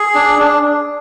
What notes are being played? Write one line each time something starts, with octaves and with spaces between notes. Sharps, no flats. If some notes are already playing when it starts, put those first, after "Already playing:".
Already playing: G#4
D4
D4